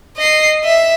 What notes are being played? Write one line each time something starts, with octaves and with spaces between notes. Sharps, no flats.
D#5 C7
E5